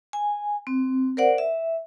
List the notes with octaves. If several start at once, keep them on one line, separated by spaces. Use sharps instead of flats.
G#5
C4
A#4 C5 D5 F#5
E5